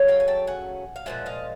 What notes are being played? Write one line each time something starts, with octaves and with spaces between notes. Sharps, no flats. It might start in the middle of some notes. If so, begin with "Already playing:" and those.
Already playing: C#3 F#3 A3
F5 G5
G#5
G5 A5
F#5 G#5
F5
A#2 F3 G#3 E5 F#5
D#5 F5